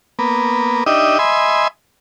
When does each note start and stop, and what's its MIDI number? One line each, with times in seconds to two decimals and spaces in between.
0.19 0.84 58
0.19 0.84 59
0.86 1.18 62
0.86 1.18 63
0.86 1.18 67
0.86 1.18 75
0.86 1.18 76
1.19 1.68 75
1.19 1.68 76
1.19 1.68 80
1.19 1.68 83
1.19 1.68 84